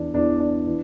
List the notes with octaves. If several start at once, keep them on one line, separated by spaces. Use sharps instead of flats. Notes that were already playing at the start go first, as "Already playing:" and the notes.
Already playing: E2 E3 D4
E2 E3 D4
D4
E3